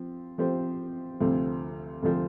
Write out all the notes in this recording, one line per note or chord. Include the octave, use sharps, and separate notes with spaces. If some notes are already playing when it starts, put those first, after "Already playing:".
Already playing: F3 C4
F3 C4 G4 C5
D2 C3 F3 C4
D2 C3 F3 C4